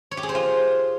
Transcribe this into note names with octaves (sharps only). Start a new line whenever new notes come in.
C#5
G4
G#4
C5
F4